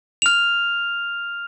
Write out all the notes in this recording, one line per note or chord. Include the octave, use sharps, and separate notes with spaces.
F6 F7